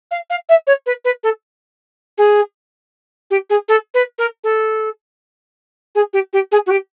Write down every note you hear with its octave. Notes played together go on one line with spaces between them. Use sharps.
F5
F5
E5
C#5
B4
B4
A4
G#4
G4
G#4
A4
B4
A#4
A4
G#4
G4
G4
G#4
F#4
G4